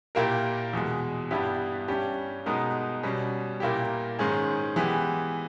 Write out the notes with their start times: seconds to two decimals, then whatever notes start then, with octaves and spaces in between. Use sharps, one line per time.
0.15 A#2 A#3 E4 G4 A#4
0.73 E2 B2 G#3
1.31 G2 G3 B3 E4 G4
1.88 G2 G3 C#4 G4
2.46 B2 G#3 B3 D#4 A#4
3.03 B2 G3 C#4
3.60 A#2 A#3 E4 G4
4.19 G#2 D#3 G#3 C#4 G#4
4.76 E3 G#3 B3 G4